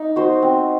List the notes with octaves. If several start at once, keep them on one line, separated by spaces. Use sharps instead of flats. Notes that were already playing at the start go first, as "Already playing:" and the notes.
Already playing: D#4
F#4 C5
C4